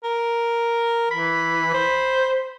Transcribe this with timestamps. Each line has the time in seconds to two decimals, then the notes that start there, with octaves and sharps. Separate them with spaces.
0.04 A#4
1.11 E3 B5
1.74 C5